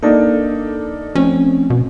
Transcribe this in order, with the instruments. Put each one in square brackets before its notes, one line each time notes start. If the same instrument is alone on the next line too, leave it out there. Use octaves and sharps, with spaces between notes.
[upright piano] A#3 D4 D#4 [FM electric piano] A4
[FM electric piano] F3 A3 C4 [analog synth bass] C#4
[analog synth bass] B2